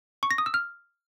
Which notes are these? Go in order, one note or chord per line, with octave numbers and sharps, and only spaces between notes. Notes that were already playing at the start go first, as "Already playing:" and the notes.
C#6
A#6
D#6
E6
F6